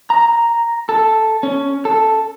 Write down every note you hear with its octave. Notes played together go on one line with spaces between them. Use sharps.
A#5
A4
C#4
A4